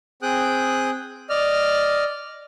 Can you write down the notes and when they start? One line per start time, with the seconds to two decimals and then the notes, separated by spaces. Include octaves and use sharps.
0.22 C4 G#4 G5 D#6 F#6
1.30 D5 D#5 F6